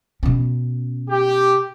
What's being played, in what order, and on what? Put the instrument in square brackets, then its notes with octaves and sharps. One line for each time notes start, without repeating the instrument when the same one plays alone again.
[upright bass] B2 C#4
[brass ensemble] G4